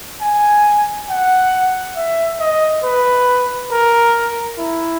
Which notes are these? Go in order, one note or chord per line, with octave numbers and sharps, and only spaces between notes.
G#5
F#5
E5
D#5
B4
A#4
E4